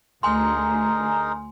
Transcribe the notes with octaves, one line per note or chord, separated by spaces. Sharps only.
D2 D#4 G#4 A#4 G#5 C6